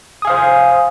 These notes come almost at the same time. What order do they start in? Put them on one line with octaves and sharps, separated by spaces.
D#6 G#5 F5 C5